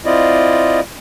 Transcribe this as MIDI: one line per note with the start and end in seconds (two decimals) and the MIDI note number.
0.05 0.80 60
0.05 0.80 64
0.05 0.80 65
0.05 0.80 74
0.05 0.80 75